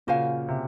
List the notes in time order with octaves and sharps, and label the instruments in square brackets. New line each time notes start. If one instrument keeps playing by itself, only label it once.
[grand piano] A#2 C#3 [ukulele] F#4 C5 F5 G#5
[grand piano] C3